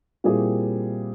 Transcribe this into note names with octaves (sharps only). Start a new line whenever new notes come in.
A#2 G3 C4 E4 G#4